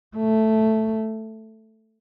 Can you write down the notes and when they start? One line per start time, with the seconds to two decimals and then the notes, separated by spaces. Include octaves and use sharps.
0.17 A3